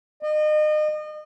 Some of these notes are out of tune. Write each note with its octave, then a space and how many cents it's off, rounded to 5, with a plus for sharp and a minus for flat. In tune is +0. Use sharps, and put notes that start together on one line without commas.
D#5 -35